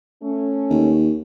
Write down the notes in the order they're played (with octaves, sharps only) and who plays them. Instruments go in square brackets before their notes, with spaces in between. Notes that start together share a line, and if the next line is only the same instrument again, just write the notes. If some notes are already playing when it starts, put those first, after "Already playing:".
[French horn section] A3 C#4
[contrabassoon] D#2